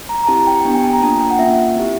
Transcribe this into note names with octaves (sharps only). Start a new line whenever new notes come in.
A#5
A#5
C4 E4 G4 A5
G5
B3 D4 G4 G5
G#5
A5
A#5
A#3 D4 F4 A5
G5
F#5
A#3 C#4 F4 E5
C4 E4 G4